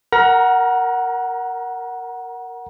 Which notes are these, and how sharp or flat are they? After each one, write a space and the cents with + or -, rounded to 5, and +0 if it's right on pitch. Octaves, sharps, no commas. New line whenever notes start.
A#4 +0 F#5 +5 A#5 +35